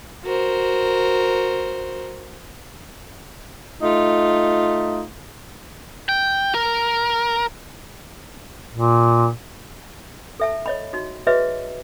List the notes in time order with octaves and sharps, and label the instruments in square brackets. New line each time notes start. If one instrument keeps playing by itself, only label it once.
[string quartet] F#4 A#4 C5
[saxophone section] A3 D#4 F4
[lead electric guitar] G5
A#4
[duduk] A#2
[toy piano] A4 E5 A5
C#5 D#5 B5
D#4 F#4
F#4 G#4 B4 C#5 D#5 E5